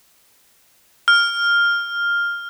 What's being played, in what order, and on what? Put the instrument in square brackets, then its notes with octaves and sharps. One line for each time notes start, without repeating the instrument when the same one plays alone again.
[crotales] F6